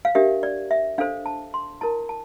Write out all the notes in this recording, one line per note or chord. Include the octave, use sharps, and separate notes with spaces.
F5
D4 G4 A#4 E5
D5
E5
D4 A4 C5 F5
A5
C6
E4 A#4 A5
A5